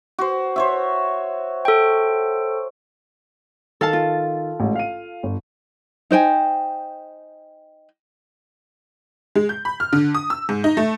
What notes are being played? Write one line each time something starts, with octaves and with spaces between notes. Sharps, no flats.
F#4 C5
C5 C#5 E5
A4 G5
D#3 A4 F5 A5
F4
A1 G#2
F5 D#7
G1
D#4 C5 G5 G#5
G#3
G6
B5
F6
D3
D#6
E6
G#2
D#4
A3